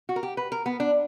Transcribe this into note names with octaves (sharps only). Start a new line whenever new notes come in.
F#4
A#4
G4
B4
A#4
B3
D4